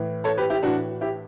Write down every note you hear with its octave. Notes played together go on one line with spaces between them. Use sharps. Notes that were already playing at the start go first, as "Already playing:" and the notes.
Already playing: A2 E3
A4 C#5
G4 B4
E4 G4
A2 E3 D4 F#4
E4 G4